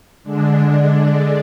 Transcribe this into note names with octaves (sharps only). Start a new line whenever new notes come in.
D3 G#3 D4